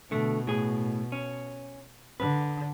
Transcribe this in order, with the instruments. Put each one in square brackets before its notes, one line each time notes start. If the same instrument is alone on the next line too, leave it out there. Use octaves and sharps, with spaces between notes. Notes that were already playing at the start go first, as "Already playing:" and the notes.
[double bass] B2 [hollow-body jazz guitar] D3 A3
[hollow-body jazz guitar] A2 G#4
C#4
[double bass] D3 [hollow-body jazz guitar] B4